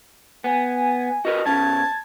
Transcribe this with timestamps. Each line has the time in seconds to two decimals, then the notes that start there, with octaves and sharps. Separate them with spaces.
0.44 B3 G#5
1.25 F#4 A#4 B4 D#5
1.46 B2 C#4 A5 G#6